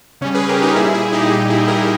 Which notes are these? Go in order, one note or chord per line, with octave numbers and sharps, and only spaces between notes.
C#3 G3 C#4
G#4 B4
G4 A#4
D#4 G4
A#2 G3 E4 G#4
E4 G#4
D#4 G4
A#2 G3 D#4 G4
E4 G#4
G4 A#4